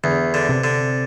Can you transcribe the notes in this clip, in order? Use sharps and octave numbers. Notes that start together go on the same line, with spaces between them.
E2 D3
D3
C3
D3